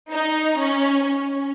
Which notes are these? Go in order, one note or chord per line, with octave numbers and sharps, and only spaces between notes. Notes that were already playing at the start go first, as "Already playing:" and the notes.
D#4
C#4
C#4